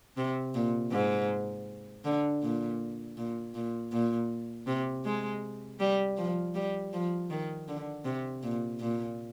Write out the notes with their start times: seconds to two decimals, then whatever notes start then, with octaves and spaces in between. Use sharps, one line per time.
0.17 C3
0.54 A#2
0.91 G#2
2.05 D3
2.42 A#2
3.17 A#2
3.54 A#2
3.92 A#2
4.67 C3
5.04 G#3
5.79 G3
6.17 F3
6.55 G3
6.93 F3
7.30 D#3
7.68 D3
8.05 C3
8.43 A#2
8.80 A#2